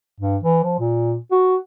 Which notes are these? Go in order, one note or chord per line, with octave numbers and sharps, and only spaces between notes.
G2
E3
F3
A#2
F#4